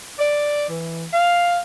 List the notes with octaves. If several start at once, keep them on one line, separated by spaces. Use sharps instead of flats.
D5
E3
F5